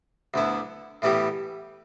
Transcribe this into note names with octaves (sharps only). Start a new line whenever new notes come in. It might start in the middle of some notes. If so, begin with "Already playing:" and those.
D2 D3 B3 E4
A2 E3 G3 B3 G4